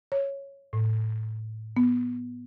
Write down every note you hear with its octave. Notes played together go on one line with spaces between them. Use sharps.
C#5
A2
B3